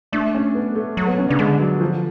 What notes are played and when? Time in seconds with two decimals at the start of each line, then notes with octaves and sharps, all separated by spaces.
0.12 A3 D4
0.35 C#4
0.55 B3
0.75 A3
0.97 F#3
1.07 B3
1.18 C#4
1.29 C#3 D4
1.39 D3 G#3
1.59 F#3
1.81 F3